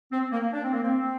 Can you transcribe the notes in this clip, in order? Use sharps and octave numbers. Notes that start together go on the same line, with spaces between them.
C4
A#3
D4
C4
A#3
C4